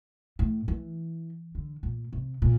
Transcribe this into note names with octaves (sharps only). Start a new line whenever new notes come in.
A2
E3
D3
A#2
C3
A#2